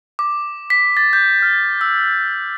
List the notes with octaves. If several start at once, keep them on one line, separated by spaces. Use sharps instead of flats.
D6
B6
A6
G6
F6
E6